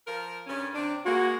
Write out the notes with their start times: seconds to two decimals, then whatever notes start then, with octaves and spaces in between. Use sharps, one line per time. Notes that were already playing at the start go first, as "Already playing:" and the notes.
0.06 F3 A#4
0.47 G2 C#4
0.74 C3 D4
1.05 G#3 A#3 F#4